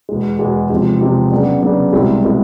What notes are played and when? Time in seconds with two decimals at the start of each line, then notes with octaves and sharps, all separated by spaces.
0.09 E2 B2 G#3
0.39 E2 B2 G#3
0.70 E2 C3 F3 G#3
1.01 E2 C3 F3 G#3
1.32 C#3 F#3 B3 D4
1.62 C#3 F#3 B3 D4
1.92 C2 B2 G#3 C4 E4
2.24 B2 G#3 C4 E4